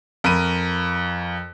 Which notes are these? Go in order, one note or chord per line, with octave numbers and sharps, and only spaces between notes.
F2 A#4 B5 D#7